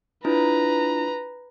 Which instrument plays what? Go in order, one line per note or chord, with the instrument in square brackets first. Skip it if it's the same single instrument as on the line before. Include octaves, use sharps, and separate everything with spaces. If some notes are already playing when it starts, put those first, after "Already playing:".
[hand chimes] D4 E4 F4 [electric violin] B4 A#5